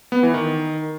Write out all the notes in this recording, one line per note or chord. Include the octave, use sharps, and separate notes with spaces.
B3
E3
D#3